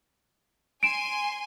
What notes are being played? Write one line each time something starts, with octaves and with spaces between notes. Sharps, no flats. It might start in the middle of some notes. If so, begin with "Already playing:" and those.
G#5 C6 D7 E7